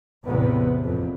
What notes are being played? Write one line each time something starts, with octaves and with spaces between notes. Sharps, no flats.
A1 E2 C3 B3
F2 A#2